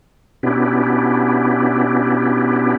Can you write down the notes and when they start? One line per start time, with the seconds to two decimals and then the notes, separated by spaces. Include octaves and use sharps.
0.43 B2 B3 C#4 D4 E4 G4